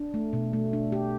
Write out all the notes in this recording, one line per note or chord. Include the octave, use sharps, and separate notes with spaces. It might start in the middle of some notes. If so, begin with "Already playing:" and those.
Already playing: D4
A3
B2
A3
D4
G4